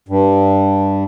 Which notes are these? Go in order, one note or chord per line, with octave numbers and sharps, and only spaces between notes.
G2